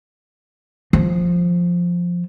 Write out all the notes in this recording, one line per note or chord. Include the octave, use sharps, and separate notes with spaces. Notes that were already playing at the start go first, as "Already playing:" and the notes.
F3